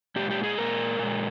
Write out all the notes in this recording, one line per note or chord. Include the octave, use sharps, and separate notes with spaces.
A#2 G#3 G4
G4
G#4
A#2 G#3 A#4
A#2 G#3